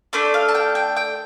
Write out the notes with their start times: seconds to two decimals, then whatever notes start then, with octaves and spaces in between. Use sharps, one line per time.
0.13 A3 D4 A4 D5
0.34 F5
0.49 A5
0.55 G5
0.75 G5
0.97 G5